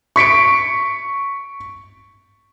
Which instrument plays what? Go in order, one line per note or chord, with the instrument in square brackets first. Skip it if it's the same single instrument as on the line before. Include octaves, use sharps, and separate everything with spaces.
[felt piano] C#6 B6 C#7 D7